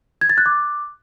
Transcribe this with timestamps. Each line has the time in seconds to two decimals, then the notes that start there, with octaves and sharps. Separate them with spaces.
0.21 G#6
0.30 A6
0.38 F#6
0.46 D6